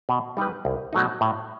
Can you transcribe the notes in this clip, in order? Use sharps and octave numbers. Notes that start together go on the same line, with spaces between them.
B2
G3 D#4 G4 B4
C2
B2 F#3 A3 D#4
A2